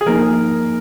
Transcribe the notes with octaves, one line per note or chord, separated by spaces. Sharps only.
G#4
F3 A#3 D#4 A#4